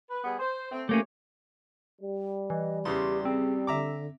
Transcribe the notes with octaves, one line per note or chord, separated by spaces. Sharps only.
B4
G3 B3 G#4
C5
A3 C4
E3 A3 A#3 C#4 G4 C#5
G3
E3 D#5
E2 C#3 G4 C6
C4 G#4
D3 E5 A#5 D6